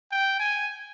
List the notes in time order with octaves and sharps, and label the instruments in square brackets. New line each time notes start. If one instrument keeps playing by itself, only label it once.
[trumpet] G5
G#5